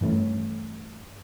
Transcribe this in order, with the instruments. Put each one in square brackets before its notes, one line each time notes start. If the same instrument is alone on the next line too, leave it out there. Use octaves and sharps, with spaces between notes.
[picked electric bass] G2 E3 A3 C#4